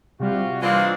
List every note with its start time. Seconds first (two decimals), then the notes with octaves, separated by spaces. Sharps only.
0.20 C3 G3 F4 F#4
0.62 E3 G#3 A#3 C4 D4 F4 C#6